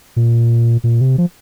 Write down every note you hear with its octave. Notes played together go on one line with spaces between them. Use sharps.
A#2
A#2
C3
F3